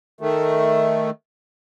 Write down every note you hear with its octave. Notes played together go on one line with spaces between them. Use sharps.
D#3 A3